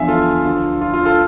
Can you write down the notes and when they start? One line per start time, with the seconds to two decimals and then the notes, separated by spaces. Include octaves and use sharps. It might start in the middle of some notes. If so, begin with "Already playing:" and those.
Already playing: E2 D3 F3 E5 F5 G#5
0.08 F4 A4
0.44 D2 D3 F3
0.81 F4
0.93 F4
1.05 F4 A4